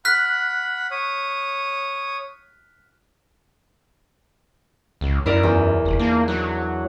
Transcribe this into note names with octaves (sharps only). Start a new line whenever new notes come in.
F#5 B5 F6 F#6 B6
C#5 D#6
C#2
F#2 E4 A#4 D5
E2
F1
A#3 D4
F#3 F#6